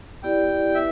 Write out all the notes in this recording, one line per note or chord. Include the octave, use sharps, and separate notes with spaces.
B3 E4 G4 D5 G5
E4 B4 E5